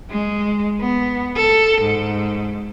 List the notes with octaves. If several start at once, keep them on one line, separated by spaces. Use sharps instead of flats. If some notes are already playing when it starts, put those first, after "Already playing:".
G#3
B3
A4
G#2